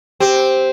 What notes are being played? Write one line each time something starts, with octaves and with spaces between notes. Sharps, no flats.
C4 G4